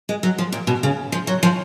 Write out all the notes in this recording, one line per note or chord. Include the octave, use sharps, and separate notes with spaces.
G#3
F#3
F3
A#2
B2
C#3
F3
F#3
F3